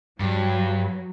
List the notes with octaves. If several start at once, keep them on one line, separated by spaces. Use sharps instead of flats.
G2 F#3